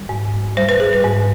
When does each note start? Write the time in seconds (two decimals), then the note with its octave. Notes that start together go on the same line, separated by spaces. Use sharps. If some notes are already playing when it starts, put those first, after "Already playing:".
Already playing: G3
0.09 G#2
0.57 G3 C5
0.69 B4
0.80 G#4
0.93 B4
1.04 G#2